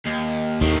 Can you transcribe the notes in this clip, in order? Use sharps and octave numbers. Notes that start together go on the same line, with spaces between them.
D#2
D#2 A2 D#3